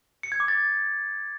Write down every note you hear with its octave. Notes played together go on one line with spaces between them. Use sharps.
C#7
G#6
D6
A6